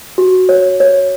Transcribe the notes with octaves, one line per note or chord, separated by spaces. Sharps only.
F#4
C#5
C#5